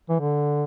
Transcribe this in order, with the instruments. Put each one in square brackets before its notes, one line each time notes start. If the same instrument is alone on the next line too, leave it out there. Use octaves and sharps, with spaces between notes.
[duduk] E3
D3